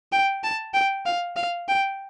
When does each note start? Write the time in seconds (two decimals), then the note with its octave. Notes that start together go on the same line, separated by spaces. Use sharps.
0.12 G5
0.44 A5
0.74 G5
1.06 F5
1.36 F5
1.68 G5